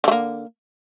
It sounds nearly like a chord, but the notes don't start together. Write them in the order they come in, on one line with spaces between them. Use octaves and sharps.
D3 A3 A#3